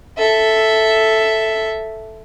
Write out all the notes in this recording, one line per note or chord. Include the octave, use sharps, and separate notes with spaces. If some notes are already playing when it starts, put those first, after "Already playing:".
A4 E5